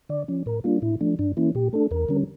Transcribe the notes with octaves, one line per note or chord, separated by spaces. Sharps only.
D3 D5
F3 C#4
A2 A#4
G3 A#3 D4 F4
A2 E4
F3 A3 D4
G2 D4
E3 A#3 C#4 E4
A#2 G4
A3 D4 A4
E2 A#4
D3 G3 C#4